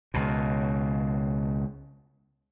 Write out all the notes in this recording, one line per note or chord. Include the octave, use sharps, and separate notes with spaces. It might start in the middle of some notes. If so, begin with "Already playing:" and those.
C#2 B2